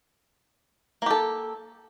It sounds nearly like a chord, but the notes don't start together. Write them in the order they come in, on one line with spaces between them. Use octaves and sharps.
A#3 G4 A4